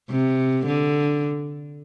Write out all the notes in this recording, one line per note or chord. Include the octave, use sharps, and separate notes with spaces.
C3
D3